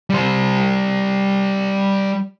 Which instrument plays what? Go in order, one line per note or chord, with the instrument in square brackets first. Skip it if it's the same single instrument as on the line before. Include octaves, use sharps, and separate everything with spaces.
[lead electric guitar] G3 C5